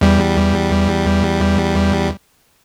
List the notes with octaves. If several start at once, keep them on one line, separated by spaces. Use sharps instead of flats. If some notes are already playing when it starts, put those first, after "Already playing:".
E2 G3